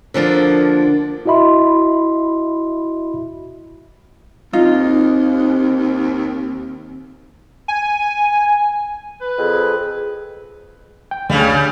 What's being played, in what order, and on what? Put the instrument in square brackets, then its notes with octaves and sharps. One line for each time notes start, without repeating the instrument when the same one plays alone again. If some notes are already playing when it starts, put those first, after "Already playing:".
[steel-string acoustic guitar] D3 F3 A#3 D4
[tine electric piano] E4 F#4 D#5 E5 B5 C6
[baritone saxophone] D#2 [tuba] C4 [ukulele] D#4 F4
[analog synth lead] G#5
[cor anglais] B4
[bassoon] F2 [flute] G#4
[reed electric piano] G5
[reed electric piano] D2 F5 G#6 [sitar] C#3 G3
[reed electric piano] G6